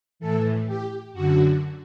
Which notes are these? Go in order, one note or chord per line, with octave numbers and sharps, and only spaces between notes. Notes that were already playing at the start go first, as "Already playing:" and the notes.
A2 E3 A4
G4
F#2 D3 F#4